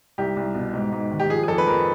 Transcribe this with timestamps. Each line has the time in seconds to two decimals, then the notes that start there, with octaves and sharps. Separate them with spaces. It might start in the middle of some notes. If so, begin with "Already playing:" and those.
0.18 C2 G4
0.37 C2
0.55 B2
0.73 G#2
0.92 G#2
1.11 D#3
1.20 G4
1.30 F3 G#4
1.44 G#4
1.48 F2 A4
1.58 B4
1.67 F2 A#4